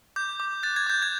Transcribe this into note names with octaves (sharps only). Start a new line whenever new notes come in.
D6 G6
D6
F#6 A6
G#6
D6 G6
G#6